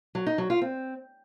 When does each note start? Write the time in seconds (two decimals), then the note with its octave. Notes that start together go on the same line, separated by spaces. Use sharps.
0.15 F#3
0.26 D#4
0.38 F#3
0.50 F4
0.61 C4